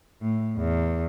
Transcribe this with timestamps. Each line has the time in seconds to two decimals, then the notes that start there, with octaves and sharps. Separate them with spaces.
0.21 A2
0.58 E2